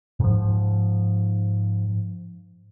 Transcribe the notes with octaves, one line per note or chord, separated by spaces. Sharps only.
G#2 F3